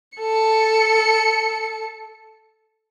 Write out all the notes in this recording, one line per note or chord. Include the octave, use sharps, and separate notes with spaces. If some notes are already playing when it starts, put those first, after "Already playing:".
A4 C#7